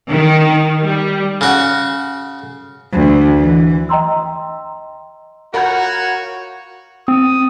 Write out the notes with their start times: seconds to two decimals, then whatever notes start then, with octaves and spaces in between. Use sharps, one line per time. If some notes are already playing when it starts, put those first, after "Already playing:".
0.10 D#3
0.83 G3
1.41 C#3 F#4
2.93 D2
3.37 E3
3.89 D#5 G5 A#5 C6 E6
5.54 F4 F#4 A#4 C#5 F#5 B5 G6
7.08 C4 D#6